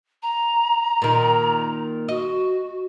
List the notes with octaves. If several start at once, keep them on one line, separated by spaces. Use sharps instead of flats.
A#5
A#2 D#3
F#4 D#5